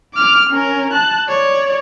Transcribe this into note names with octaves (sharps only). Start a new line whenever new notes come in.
D6 F6
C#4 A#4
A5 F#6
C#5 D5